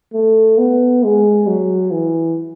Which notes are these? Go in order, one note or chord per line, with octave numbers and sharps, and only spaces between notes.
A3
B3
G#3
F#3
E3